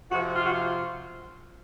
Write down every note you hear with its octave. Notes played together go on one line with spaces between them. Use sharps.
F2 C3 F3 F#4
F4
F#4
F4